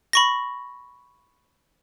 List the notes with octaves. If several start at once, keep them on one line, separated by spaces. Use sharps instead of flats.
B5 C#6 A#6